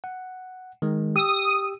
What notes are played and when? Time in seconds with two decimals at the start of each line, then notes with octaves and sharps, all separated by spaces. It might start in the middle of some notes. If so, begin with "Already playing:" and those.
0.04 F#5
0.82 D#3 G#3
1.16 G4 D#6 E6 D#7